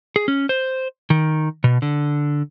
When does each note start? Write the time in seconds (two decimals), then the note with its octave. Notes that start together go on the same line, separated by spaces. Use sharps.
0.16 G#4
0.28 C#4
0.49 C5
1.10 D#3
1.64 B2
1.82 D3